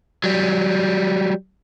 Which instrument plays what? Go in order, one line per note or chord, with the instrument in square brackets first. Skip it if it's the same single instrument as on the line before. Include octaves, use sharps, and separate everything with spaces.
[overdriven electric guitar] F#3 G3